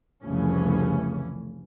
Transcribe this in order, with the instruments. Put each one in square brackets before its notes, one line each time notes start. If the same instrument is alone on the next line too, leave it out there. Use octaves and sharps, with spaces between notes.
[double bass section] F1 C2 C#3 E3 A3 C#4